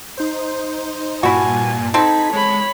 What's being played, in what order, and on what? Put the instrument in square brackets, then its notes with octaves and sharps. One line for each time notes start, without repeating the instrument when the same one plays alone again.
[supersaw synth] D#4 C5
[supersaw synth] G2 A#2 A5 [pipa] E4 F#4 [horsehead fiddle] G#5
[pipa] C4 A4 [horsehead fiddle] D#4 [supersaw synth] B5 G#6 B6
[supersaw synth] G#3 [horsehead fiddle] C#5 B5